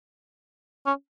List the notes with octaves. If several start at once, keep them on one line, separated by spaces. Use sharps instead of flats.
C#4